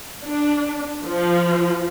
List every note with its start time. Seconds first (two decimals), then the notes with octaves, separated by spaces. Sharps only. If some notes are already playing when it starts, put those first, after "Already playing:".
0.24 D4
1.05 F3